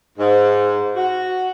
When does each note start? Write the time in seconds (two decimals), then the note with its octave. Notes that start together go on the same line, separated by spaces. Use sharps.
0.18 G#2
0.95 F#4